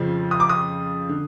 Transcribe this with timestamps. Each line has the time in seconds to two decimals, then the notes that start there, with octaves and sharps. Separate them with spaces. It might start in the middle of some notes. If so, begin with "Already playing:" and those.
Already playing: F2 C#3 F3
0.31 D#6
0.40 D6
0.49 D#6
1.09 D3